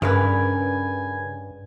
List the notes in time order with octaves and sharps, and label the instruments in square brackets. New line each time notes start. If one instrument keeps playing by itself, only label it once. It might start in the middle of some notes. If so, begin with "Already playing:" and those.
[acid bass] G2 [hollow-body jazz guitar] C#3 A#4 B4 [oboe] G#5